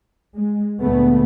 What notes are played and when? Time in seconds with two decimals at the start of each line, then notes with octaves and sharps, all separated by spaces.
0.35 G#3
0.82 D2 A#2 G#3 A3 B3